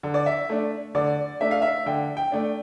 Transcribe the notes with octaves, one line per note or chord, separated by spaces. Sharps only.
D3
D5
E5
A3 D4
D3 D5
A3 D4 E5
F5
E5
D3 G5
G5
A3 D4